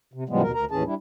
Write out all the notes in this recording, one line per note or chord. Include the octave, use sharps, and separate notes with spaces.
C3
A2 C#3 F3 G3 G#3 B3
D#2 B2 A#4
D2 A#4 A#5
D#2 A2 E3 C#4 G#4 A5
G3 D4 E4